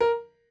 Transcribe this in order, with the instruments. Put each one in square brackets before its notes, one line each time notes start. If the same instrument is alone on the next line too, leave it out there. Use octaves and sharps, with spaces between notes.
[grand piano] A#4